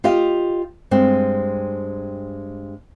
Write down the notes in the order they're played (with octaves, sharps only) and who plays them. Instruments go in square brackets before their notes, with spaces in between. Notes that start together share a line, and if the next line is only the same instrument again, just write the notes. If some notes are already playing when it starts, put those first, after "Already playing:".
[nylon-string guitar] F4 G4 D#5 F5
G2 G#3 C4